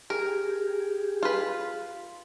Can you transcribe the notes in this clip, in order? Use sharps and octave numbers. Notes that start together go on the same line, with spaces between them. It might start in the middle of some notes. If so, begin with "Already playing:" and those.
G4 G#4 A#4
F4 B4